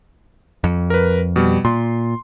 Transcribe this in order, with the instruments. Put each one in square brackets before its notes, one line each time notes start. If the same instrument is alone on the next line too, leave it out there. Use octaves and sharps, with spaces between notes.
[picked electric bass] F2
[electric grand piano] A#4 B4
B2 G3
[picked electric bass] A#2 [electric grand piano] C6